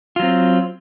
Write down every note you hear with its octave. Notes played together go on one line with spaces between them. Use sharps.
F#3 C4 F4